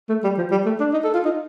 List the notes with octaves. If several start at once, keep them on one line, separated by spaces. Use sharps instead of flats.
A3
G3
F3
G3
A3
D4
D#4
A4
F4
D#4